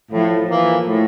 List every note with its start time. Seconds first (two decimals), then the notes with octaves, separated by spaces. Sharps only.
0.11 A2 F3
0.48 E3 A#3
0.85 A2